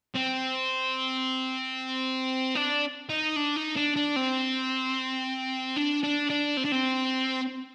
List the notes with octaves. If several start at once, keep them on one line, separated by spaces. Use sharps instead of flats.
C4
D4
D#4
D4
D#4
D4
D4
C4
D4
D4
D4
C4
D4
C4